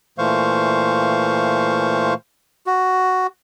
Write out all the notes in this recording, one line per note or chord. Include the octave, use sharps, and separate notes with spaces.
A#2 E3 A3 C5 F5 C#6
F#4